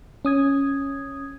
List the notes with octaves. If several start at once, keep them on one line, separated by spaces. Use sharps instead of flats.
C#4 D#6 G#6